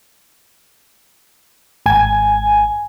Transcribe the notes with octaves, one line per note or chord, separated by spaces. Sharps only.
G#1 G#5